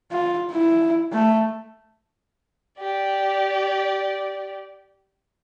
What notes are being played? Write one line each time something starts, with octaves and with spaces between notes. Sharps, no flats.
F4
E4
A3
G4 D5